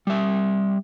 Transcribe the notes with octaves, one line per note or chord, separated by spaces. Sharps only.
G3 E5